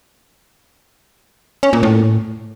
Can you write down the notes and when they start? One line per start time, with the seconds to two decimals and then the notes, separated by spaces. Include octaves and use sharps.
1.63 C#4
1.73 A#2
1.83 A2